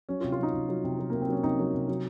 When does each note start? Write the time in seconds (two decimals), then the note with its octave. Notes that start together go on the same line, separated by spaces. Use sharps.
0.09 F#3 C#4
0.20 F4
0.24 C3
0.32 F4
0.39 F#3 D#4
0.54 C3
0.69 F#3
0.84 C3
0.99 F#3
1.10 C3 A#3
1.22 C4
1.28 F#3 C#4
1.43 C3 D#4
1.59 F#3
1.74 C3
1.88 F#3